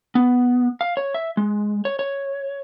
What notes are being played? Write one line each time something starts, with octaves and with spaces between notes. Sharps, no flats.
B3
F5
C#5
E5
G#3
C#5
C#5